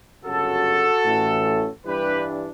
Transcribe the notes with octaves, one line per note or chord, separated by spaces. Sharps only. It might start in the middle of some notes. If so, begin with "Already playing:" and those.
G1 F#2 C#3 F#4 A4
A1 A2 E3 A3 C#4
G2 E3 G3 D4 G4 B4